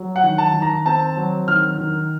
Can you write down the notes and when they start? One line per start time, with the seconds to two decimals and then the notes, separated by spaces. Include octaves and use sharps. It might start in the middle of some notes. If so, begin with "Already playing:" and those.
Already playing: F#3
0.16 F#5
0.24 D#3
0.38 A5
0.54 D#3
0.62 A#5
0.86 C4 A5
1.17 F#3
1.48 D#3 F6
1.78 D#3